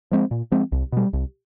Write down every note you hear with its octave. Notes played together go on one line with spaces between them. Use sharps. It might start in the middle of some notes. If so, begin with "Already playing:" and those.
F3 G#3 C4
A#2
F3 G#3 C4
C2
B2 G3
C2